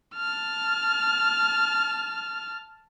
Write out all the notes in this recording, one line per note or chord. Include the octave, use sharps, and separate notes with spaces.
A5 F6